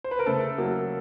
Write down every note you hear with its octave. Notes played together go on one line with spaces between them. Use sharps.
C5
B4
A#4
C#3 A3 A4
F#3 A#3